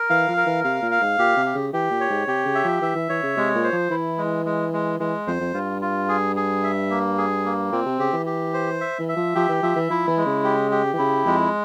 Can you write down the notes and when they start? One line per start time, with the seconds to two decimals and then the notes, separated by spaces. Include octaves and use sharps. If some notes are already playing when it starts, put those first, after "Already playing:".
Already playing: A#4
0.10 E3 F5
0.28 F3
0.37 A#4
0.46 E3
0.64 C3 F5
0.82 A#2
0.91 F5
1.01 G#2
1.19 A#2 G4
1.37 C3
1.46 G4
1.55 C#3
1.73 E3 G4
1.91 A#2
2.00 C#5
2.10 G#2
2.27 C3 G4
2.46 C#3
2.55 E5
2.64 F3
2.82 E3 E5
2.95 E3
3.09 E3 C#5
3.23 C#3
3.37 C3 G#3
3.55 A#2
3.64 C5
3.73 F3
3.91 E3 E4
4.18 G#3
4.45 G#3
4.73 G#3
4.99 E3 G#3
5.27 F2 C5
5.40 F2
5.54 G2 F4
5.82 F4
6.08 G#4
6.36 G#4
6.64 E5
6.90 A#3
7.18 G#4
7.45 A#3
7.72 A#2 C4
7.86 C3
7.99 C#3 G4
8.13 E3
8.26 G4
8.54 C5
8.81 E5
8.99 E3
9.09 E5
9.17 F3
9.35 F3 G4
9.49 E3
9.63 F3 E5
9.76 E3
9.90 F3 E4
10.07 E3
10.17 G#3
10.26 C#3
10.44 G4
10.71 G4
10.93 E3
10.99 C#3 E4
11.26 F2 G#3